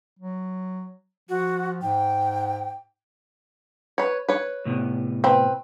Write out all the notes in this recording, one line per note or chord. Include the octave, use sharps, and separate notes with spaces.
F#3
F3 F#4
G#2 G5
B4 C#5
B4 C#5
A2 C3 B3
C4 B4